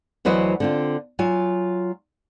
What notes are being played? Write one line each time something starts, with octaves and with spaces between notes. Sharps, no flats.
D2 E3 F#3 B4 C5 D#5
D3 C4 F4
F#3 F4 G#5